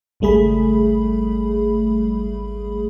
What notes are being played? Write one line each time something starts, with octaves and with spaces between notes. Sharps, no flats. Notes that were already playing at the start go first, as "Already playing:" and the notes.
G#1 C#2 G3 A3 G#4 B5